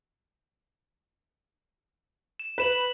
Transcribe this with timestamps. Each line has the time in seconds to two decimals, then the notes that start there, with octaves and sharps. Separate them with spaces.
2.39 E7
2.58 B4 B6 E7 F#7